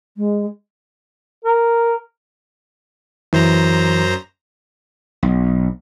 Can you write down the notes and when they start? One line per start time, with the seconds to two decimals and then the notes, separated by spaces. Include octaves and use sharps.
0.17 G#3
1.45 A#4
3.33 F#2 E3 C5 A#5
5.23 B1